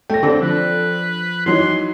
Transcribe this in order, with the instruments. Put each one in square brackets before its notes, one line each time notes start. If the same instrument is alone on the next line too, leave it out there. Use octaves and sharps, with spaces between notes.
[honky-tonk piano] A3 A#6 [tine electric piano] G5
[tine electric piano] D3 [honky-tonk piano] C4 D4 A4
[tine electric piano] F3 [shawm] B4
[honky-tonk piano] E3 F#3 D#4 [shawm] C6